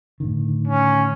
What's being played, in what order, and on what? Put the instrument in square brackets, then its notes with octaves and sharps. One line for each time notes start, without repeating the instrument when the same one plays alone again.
[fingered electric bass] A2 D3 D#3
[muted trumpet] C#4